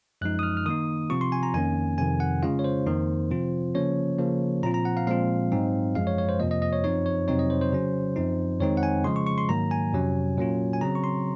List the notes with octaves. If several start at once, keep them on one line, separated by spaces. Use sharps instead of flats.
F#2 F3 G#3 D#4 F#6
D#6
F6
F6
D#3 A#3 D#4 D#6
C3 F3 C4 F4 C#6
C6
G#5
A#5
F2 D#3 A#3 C#4 G#5
F2 C3 D#3 G#5
F#5
C#3 G#3 C#4 F4 F5
C#5
C5
F2 D#3 A#3 D#4
C3 F3 C4 F4
C#3 F3 A#3 C#4 C#5
C#3 F3 A#3
A#2 F3 C4 F4 A#5
A#5
F#5
F5
A#2 F3 G#3 C4 F4 F5
G#2 F#3 C4 D#4
F#2 F3 G#3 F5
C#5
C#5
C5
F2 C3 F3 A#3 D#5
D#5
D#5
C#5
F#2 F3 C4 D#4 C#5
C#5
F2 C3 F#3 C4 D#4 C#5
D#5
C5
C5
C#3 F#3 C#4
F#2 F3 C4 D#4
F2 D#3 G#3 C4 D#4 C#5
F#5
G#5
C#3 F3 G#3 C6
C#6
C#6
C6
G#2 D#3 F#3 A#3 A#5
G#5
F2 C3 F#3 C#4
A#2 F#3 A#3 C#4 F4
G#5
C#3 F#3 C4 A#5
C#6
C6